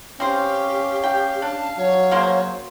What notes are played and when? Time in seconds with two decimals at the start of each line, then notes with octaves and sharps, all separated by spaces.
0.20 C4 C#4 G4 C5 F5
1.03 G5
1.42 D4 A5
1.77 F#3 C#5
2.11 C#3 A#3 C5